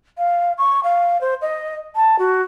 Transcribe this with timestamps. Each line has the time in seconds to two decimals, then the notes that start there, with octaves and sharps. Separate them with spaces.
0.18 F5
0.58 C#6
0.84 F5
1.21 C5
1.42 D#5
1.95 A5
2.19 F#4